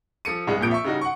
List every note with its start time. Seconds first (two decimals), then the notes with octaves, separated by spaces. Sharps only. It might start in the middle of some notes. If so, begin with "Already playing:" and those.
0.25 F3 A4 C#7 D#7
0.47 C2 G2 G#3
0.60 A#1 F2 A#2 F3 G6 D7
0.71 E5 C#6
0.84 C#3 G3 D#4 F#4 D#5
1.01 F#5 C#6